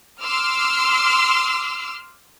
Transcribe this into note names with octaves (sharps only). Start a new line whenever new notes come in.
C6 D6 E6 F6